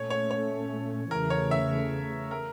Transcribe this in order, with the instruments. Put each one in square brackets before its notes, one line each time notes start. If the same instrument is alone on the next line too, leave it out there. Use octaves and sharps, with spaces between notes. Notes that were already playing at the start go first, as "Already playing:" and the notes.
Already playing: [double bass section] A#2 A3 C#4 [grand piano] C#5
[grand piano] C#5
C#5
[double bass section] E2 C#3 E3 A3 [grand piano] A#4
[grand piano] C#5
E5
A#4